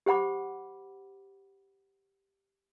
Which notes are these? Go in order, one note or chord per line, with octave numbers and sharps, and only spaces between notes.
G4 C5 F#5 B5 D6